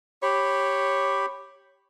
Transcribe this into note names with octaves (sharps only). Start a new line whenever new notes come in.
G4 C#5 B5